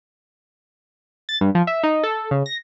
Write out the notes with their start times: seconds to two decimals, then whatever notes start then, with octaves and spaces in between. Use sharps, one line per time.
1.29 A6
1.41 G2
1.55 F3
1.67 E5
1.83 D#4
2.03 A4
2.31 C#3
2.46 A#6